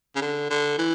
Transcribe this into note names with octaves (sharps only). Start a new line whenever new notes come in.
C#3
D3
D3
E3